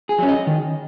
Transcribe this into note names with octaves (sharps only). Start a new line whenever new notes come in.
G#4
F#3 C#4
D#5
D#3